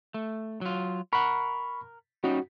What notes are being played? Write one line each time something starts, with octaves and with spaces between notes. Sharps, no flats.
A3
F#3 F4
A#4 F#5 B5 C#6
G3 C#4 D#4 F#4